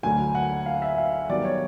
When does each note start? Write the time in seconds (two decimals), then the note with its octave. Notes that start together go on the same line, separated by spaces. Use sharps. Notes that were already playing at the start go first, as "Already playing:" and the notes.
0.03 D2 D3 F#3 G#5
0.35 F#5
0.66 F5
0.82 E5
0.98 F5
1.29 G2 D#3 F#3 B3 D5
1.45 C#5